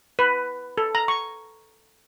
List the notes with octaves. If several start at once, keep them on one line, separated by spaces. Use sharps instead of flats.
B4
A4
A#5
C#6